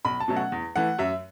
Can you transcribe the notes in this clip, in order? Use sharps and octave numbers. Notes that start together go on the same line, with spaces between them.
B1 B5
A5
B2 F#3 A3 C#4
F#5
E2
E3 A3 F#5
F#2 E5